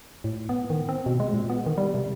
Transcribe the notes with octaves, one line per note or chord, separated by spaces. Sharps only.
A2
B3
D#3
C4
B2
G#3
A#2
B3
D#3
G3
C3